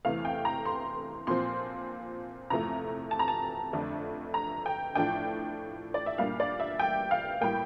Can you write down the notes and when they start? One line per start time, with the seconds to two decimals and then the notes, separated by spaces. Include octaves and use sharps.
0.05 E2 C3 E3 A3 F5
0.25 G5
0.45 A#5
0.65 C6
1.27 A#2 F3 C4 C6
2.50 E2 C3 F3 A3 A#5
3.11 A5
3.19 A#5
3.28 A5
3.73 F2 D3 A3 D4
4.34 A#5
4.66 G5
4.95 A2 F3 A3 D4 G5
5.94 D5
6.06 E5
6.18 A#2 G3 A#3 D4 F5
6.40 D5
6.60 E5
6.80 G5
7.11 F5
7.41 A2 G3 A#3 G5